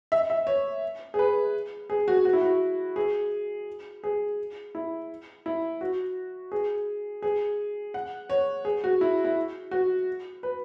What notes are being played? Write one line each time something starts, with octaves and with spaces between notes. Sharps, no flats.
E5
E5
C#5
G#4
B4
G#4
F#4
F#4
E4
F#4
G#4
G#4
E4
E4
F#4
G#4
G#4
F#5
C#5
G#4
F#4
E4
E4
F#4
B4